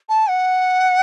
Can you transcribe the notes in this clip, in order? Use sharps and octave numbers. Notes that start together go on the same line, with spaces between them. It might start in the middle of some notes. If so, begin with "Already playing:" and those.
A5
F#5